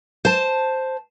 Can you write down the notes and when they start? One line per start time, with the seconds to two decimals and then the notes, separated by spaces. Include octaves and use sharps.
0.25 C5 A5